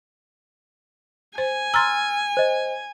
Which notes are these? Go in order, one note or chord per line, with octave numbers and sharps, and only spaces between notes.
C5 G#5
A#5 C6 E6 F6 A6
C5 D#5